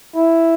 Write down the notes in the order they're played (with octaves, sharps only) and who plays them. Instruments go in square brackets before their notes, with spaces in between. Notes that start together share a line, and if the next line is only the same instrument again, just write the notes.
[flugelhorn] E4